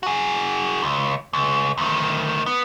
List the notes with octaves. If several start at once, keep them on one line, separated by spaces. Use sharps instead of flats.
F#4 G#4
C#2
C#2
D2 D#3
B3